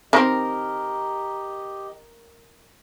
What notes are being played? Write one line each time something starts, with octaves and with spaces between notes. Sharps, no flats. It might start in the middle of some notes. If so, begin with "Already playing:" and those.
D#3 C4 G4 A#4 D#5